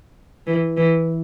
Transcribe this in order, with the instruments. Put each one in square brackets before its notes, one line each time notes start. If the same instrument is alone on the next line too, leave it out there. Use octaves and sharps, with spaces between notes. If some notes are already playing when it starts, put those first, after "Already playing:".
[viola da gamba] E3
E3